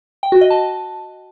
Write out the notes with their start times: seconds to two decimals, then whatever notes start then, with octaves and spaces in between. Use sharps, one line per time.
0.23 G5
0.32 F#4
0.41 D#5
0.50 A5